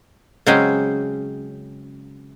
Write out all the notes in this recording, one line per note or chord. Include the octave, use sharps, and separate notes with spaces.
C#3 F#3 G#3 C4 C#4